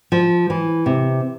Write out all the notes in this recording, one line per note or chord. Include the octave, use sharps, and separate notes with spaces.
F3
E3
C3